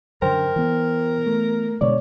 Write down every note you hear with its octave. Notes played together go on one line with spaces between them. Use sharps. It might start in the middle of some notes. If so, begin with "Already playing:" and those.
F#2 D3 A#4 C5 G5
E3 B3
A3
B2 D3 G#3 C#5 D5